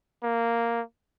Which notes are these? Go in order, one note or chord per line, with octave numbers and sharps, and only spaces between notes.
A#3